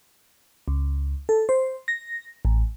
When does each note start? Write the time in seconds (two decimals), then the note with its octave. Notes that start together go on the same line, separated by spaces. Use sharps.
0.68 C#2
1.29 A4
1.49 C5
1.88 A#6
2.45 A1